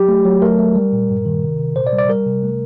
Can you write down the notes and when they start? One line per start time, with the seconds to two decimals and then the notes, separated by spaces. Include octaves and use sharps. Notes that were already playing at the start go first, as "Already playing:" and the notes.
Already playing: F#3 G4
0.08 A3
0.25 F#3
0.42 A3 A#4
0.59 A3
0.75 G3
0.93 A#2
1.09 G2
1.26 D#3
1.42 C3
1.58 C3
1.76 A#2 C5
1.87 D5
1.93 G3
1.99 D5
2.09 G3 A#4
2.26 C3
2.43 A3